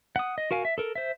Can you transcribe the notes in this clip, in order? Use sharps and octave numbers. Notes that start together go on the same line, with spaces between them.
F#5 D#6
D#5
F#4 A#4 F5 G#5
E5
A4 A#4
C5 E5